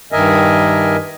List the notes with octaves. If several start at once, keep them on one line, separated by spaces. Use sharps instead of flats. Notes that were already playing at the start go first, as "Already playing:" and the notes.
G2 D#3 A#4 D#5 E5 G#5